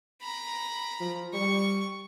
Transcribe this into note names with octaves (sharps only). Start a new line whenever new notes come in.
A#5 B5
F3
G3 C#6